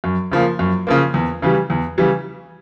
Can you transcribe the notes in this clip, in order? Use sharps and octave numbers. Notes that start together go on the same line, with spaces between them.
F#2
C#3 F3 A#3
F#2
C#3 F3 A#3
E2
C#3 E3 G3
E2
C#3 E3 G3